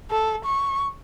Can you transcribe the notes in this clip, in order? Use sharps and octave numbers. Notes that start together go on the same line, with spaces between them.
A4
C#6